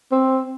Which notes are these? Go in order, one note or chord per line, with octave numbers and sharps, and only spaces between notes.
C4